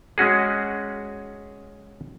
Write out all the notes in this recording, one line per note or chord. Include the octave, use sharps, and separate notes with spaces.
G#3 C#4 F#4 G#4